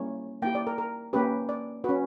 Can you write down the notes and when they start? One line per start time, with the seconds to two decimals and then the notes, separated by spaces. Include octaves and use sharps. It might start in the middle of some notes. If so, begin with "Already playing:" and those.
Already playing: G3 A#3 C#4 E4 C#5
0.42 A#3 E4 G4 G5
0.55 D5
0.67 A#4
0.78 A#4
1.13 A#3 C#4 G4 B4
1.49 D5
1.84 C#4 F#4 B4